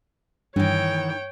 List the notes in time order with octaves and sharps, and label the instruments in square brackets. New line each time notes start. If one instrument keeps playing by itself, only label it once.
[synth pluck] G2 [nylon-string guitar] D#3 E3 [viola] C#5 G5